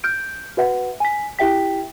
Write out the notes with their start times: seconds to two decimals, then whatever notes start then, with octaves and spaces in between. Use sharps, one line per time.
0.04 F6 G6 D7
0.57 F#4 B4 E5 F#5
1.00 G#5 B6
1.39 E4 G4 E5 G5 B6